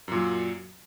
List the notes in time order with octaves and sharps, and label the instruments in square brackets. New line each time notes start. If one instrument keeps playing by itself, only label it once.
[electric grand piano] F#2
A#2
F#3